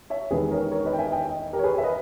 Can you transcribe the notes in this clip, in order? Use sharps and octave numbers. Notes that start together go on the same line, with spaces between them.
C#5 E5
E1 E2 D#3 G#4 B4
A#4 C#5
A#4 C#5
B4 D#5
G5
E5 G#5
D#5 G5
G4 A#4
C#5
G#4 B4
E5
B4 D#5